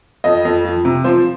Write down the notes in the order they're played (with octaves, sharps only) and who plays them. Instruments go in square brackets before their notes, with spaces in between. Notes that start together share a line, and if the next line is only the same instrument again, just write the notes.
[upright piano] F2 D#5
F2
F3
C3
F3 C5